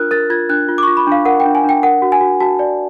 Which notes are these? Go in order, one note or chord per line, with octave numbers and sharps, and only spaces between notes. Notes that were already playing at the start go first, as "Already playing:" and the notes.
Already playing: D4 F4 A#4 F6 F#6
A#4 A6
F4 G#6
D4 F#6
F4
D6
F4 C#6
B5
D4 F5
A#4 F#5
G5
D4
G#5
D4 G5
A#4 F#5
F#4
G#5
F#4
F#4 A5
D5